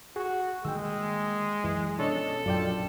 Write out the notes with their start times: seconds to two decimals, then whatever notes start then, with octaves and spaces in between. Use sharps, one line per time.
0.16 F#4 G#4
0.65 D#3 G3 G#3 A#3 G5 E6
1.64 F#2 E3
1.99 B2 F3 C#4 D4 A4 C#5 D#5
2.46 A#1 F#2 F4 D5 G5